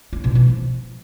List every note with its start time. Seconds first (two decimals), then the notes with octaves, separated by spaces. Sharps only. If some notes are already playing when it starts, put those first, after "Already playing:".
0.13 F4
0.24 B2
0.35 F#3
0.47 F3